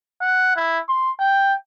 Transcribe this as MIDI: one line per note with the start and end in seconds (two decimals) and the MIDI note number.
0.21 0.53 78
0.56 0.79 64
0.88 1.11 84
1.20 1.53 79